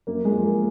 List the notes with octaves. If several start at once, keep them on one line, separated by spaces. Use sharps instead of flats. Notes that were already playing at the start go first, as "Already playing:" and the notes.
F#2 A#3
G#3
F3
A#3